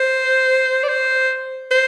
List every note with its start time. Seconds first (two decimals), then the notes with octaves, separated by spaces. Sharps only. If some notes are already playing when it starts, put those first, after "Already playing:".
Already playing: C5
0.84 D5
0.88 C5
1.71 C5